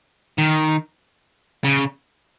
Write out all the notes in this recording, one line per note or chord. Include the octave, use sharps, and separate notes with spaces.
D#3
C#3